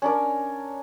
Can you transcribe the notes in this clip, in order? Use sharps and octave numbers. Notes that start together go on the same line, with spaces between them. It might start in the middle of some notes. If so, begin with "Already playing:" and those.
C#4 D4 A#4